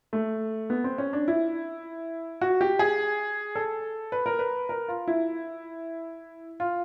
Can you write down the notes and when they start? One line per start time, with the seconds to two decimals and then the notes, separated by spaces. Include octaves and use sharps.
0.13 A3
0.70 B3
0.84 C4
0.98 C#4
1.13 D4
1.28 E4
2.41 F#4
2.61 G4
2.79 G#4
3.56 A4
4.12 B4
4.26 A#4
4.39 B4
4.69 A#4
4.88 F4
5.08 E4
6.60 F4